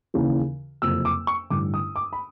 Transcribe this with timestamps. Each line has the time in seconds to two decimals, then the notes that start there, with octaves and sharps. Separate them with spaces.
0.14 D#2 C#3 E3
0.82 F#1 F2 C3 E6
1.05 D6
1.27 C#6
1.50 A1 G2 D3 D6
1.74 D#6
1.96 D6
2.13 B5